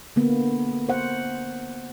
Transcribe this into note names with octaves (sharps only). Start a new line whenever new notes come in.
D3 A#3 B3
C5 F#5